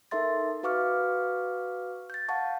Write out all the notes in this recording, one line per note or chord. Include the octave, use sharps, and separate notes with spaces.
D#4 A4 A#4 E5 C6 A6
F#4 B4 F5 C#6 D6 F6
G6 A6
F5 F#5 A5 C#6